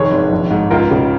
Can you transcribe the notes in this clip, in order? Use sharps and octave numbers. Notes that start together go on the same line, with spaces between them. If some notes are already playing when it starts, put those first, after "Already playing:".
Already playing: F1 D#3 G#4 C#5
G#1
A#1
G#2
C#2 F4 A#4
C#3